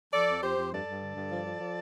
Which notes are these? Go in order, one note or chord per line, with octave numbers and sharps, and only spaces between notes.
F3 A4 D5
F2
F2 G4 C5
F2
G2 A4 D5
G2
D3
G2
F3
F3
F3